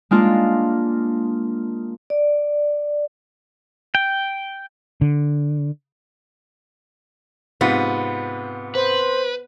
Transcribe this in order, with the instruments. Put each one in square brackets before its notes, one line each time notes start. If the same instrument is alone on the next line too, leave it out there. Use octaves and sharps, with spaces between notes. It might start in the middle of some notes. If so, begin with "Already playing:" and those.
[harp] G#3 A#3 D4 F4
[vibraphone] D5
[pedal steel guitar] G5
[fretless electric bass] D3
[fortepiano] G#2 C3 F4 [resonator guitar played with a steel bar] B3
[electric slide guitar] B4 [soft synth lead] C5